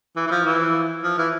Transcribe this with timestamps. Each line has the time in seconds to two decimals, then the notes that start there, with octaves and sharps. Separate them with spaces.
0.16 E3
0.26 E3
0.31 F3
0.45 E3
1.03 F3
1.18 E3